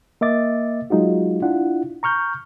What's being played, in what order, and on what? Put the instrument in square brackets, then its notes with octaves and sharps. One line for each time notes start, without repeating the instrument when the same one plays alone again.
[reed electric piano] A#3 D#5 E5 D6 A6
F#3 G#3 D#4 F4 F#4
D4 E4 F4 F#5
A#5 C#6 F6 G6